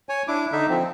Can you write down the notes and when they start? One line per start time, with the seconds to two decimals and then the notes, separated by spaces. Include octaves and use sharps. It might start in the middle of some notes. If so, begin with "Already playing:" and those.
0.09 C#5 G#5
0.28 D4 E4 D6
0.52 D3 D#4 E5
0.69 F3 C4